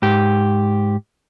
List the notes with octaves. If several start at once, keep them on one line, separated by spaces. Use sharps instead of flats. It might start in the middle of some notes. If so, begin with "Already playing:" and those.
G#2 G4